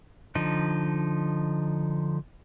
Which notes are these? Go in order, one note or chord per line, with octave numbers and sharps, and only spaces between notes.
D3 F3 D#4